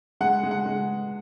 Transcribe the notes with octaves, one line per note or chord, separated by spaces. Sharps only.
G#3 F#5
G#3
F#5
G#3